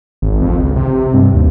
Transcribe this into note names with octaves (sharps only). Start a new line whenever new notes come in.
G#1
F2
C#2
C3
G2
D#2